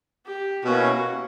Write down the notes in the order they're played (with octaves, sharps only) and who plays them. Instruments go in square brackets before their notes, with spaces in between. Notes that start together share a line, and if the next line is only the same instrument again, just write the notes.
[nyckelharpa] G4
[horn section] B2 A#3 C#4 E4 [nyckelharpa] F#4